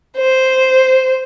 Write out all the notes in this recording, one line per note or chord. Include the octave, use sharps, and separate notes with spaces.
C5